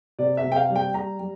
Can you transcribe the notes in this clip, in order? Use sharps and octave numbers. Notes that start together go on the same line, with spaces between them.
C3 D5
E5
C3
G5
F5
G3
G5
G3 A#5
G3